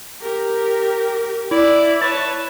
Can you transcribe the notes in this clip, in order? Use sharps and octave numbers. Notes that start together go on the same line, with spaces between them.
G4 A#4
E4 D5
B4 C#5 A5